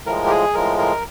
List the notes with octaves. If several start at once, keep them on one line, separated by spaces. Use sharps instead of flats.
A2 F3 G#3 A#4
G4
G#4
A2 F3 G#3 A#4
A#4